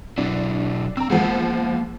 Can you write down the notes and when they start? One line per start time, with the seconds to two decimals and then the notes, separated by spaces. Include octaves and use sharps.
0.18 B2 F#3 D4 E4
0.97 C4 A#5 E6
1.10 E2 F3 G#3 A#3 F#5